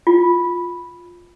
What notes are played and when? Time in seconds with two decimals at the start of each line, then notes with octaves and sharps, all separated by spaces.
0.07 F4